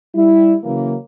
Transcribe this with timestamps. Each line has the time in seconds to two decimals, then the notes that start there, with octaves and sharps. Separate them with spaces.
0.15 G3 E4
0.64 C#3 E3 F#3 A#3